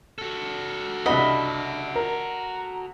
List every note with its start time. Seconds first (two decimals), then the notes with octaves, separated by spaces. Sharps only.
0.18 F#4 A4
1.06 C2 D4 D#5 F#5 B5
1.96 A#4 A#5